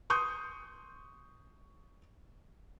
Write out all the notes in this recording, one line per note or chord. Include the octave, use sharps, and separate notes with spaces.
C6 C#6 D#6 G6